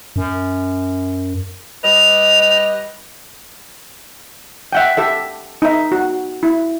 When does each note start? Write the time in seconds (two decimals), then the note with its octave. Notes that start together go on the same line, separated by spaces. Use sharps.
0.16 F#2
1.84 G3 B4 D#5 F7
4.73 E5 F#5 G5
4.97 G4 A4 E5
5.62 D#4 E5
5.92 F#4
6.43 E4